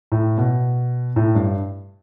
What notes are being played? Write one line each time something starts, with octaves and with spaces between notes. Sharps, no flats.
A2
B2
A2
G2